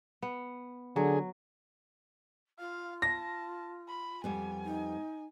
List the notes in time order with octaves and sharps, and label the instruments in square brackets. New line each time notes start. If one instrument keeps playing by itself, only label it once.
[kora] B3
[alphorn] D3 [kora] F#3 [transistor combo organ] G#4
[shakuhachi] F4 [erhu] F5
[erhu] A5 [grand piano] A#6
[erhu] B5
[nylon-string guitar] F2 G3 B3 [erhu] G#5
[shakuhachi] D#4